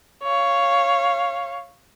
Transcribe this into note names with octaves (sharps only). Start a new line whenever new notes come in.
C#5 F5